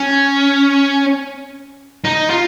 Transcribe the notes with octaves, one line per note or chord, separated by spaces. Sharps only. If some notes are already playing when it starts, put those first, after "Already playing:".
Already playing: C#4
D#4
F4